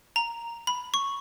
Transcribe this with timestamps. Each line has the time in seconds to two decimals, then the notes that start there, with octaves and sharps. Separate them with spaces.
0.16 A#5
0.67 B5
0.94 C#6